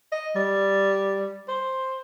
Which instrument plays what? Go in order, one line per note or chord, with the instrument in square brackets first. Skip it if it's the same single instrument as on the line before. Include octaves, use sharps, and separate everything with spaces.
[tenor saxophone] D#5
G3
C5